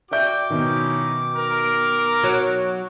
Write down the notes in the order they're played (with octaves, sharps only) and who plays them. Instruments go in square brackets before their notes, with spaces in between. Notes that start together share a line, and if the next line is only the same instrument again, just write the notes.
[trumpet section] F#4 G5 [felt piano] D5 E5 G6 [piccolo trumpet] D6
[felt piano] B2 D#3 [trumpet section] C#4 D#4 E4
[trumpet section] A#4
[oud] F#3